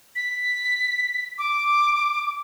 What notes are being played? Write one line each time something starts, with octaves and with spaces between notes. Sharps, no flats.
B6
D6